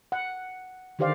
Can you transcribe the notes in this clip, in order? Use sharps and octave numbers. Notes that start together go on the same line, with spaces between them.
F#5
D3 D#3 G4 C5 D5 F5